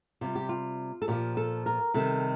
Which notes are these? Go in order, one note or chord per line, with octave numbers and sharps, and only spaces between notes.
C3 G3 F4
G4
F4
A4
A#2 F3 G4
A4
A#4
C3 D#3 G3 A4